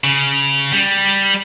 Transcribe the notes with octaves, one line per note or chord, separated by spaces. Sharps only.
C#3
G3